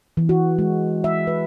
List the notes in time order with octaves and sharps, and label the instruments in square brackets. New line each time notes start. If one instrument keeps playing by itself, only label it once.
[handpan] E3
F#4
G#3
E5
B4